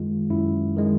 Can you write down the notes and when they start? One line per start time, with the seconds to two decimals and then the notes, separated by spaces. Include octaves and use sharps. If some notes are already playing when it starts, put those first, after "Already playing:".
Already playing: F#2 D#3 G#3 F4
0.30 F#2 E4
0.76 D#3 G#3